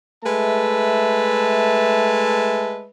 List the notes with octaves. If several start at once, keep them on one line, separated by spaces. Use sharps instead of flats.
G#3 A3 B4 E5 A5